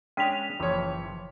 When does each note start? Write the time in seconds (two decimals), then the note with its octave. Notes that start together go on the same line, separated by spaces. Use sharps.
0.17 G#3 C#4 D4 G5 B6 F7
0.60 F#1 E3 F3 C#5